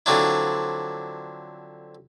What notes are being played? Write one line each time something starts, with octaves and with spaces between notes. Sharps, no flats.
D3 F3 F#3 C4 D4 E4